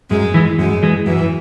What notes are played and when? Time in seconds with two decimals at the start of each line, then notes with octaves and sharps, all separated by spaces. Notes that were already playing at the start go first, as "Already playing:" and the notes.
0.10 F#2 G#3
0.34 E3 G#3
0.58 F#2 G#3
0.83 E3 G#3
1.06 F#2 E3